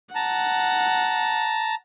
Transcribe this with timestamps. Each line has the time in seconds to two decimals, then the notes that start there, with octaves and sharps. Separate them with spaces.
0.15 F#5 A5 A#5